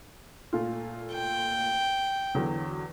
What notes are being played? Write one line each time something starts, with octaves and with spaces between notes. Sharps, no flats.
A#2 A3 F4
G5
E2 D3 F#3